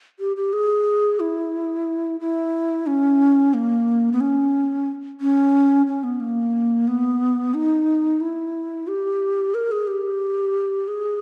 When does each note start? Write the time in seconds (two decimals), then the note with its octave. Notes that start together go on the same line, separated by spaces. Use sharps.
0.19 G4
0.37 G4
0.53 G#4
1.20 E4
2.20 E4
2.87 C#4
3.54 A#3
4.12 B3
4.21 C#4
5.21 C#4
5.87 C#4
6.04 B3
6.20 A#3
6.88 B3
7.54 D#4
8.20 E4
8.88 G4
9.54 A#4
9.72 G#4
9.87 G4
10.88 G#4